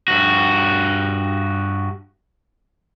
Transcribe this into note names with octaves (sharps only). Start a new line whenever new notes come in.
G2 F#4